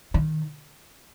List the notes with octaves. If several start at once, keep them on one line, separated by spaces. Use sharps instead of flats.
D#3